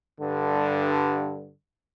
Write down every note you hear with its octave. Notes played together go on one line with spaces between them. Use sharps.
G2 D3